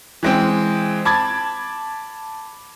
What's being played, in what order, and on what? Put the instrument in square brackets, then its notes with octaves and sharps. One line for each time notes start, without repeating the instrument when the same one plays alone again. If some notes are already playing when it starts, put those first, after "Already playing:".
[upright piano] E3 G#3 C4
A5 B5 D6 G#6 A6